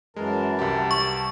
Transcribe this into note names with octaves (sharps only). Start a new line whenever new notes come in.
F#2 E3 G#3 A#4 A5
C2 G4
C#6